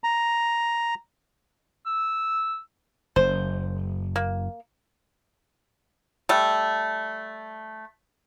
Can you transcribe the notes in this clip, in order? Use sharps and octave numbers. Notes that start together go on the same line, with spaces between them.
A#5
E6
F#1 C5
A#3
G3 A3